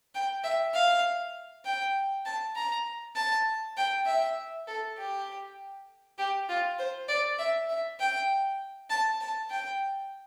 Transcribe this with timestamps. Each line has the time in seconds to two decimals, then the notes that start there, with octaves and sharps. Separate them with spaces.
0.15 G5
0.44 E5
0.74 F5
1.65 G5
2.25 A5
2.56 A#5
3.16 A5
3.77 G5
4.06 E5
4.67 A4
4.97 G4
6.18 G4
6.49 F4
6.79 C5
7.09 D5
7.39 E5
7.69 E5
8.00 G5
8.90 A5
9.21 A5
9.50 G5